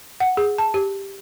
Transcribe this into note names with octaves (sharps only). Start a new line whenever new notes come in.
F#5
G#4
A5
G4